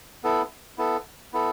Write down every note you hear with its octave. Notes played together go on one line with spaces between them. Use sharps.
B3 E4 A4
B3 E4 A4
B3 E4 A4